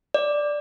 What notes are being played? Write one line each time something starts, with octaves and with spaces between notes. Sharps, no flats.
D5